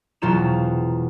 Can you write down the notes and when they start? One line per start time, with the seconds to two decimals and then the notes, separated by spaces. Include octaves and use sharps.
0.22 E1 F#3 F4 C5 A#5 E7